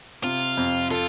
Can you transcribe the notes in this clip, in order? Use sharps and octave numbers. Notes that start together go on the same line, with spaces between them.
C3 F4
F2
F4 A4